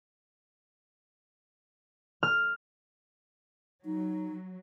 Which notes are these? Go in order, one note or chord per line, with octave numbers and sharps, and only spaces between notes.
F6
F#3 D#4